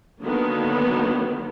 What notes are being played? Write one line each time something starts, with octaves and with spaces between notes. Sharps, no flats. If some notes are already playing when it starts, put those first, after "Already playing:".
D3 D#3 F#3 A#3 B3 D#4